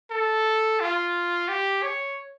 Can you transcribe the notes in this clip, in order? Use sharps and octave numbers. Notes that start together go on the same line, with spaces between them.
A4
F4
G4
C#5